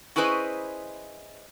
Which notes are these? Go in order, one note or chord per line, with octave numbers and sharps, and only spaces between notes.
C#4 E4 G#4 B4 C5 D#5